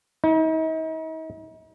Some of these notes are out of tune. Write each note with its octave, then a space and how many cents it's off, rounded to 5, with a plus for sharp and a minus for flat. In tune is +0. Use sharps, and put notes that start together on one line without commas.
D#4 +45